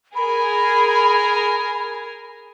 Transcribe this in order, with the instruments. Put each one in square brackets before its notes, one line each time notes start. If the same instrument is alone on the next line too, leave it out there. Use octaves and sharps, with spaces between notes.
[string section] G#4 A#4 G#5 [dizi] B5